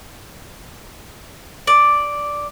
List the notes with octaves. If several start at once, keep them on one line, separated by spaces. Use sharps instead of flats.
D5